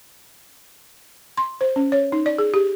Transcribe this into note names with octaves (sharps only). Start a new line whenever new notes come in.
C6
C5
C#4
C#5
D#4
D5
G#4
G4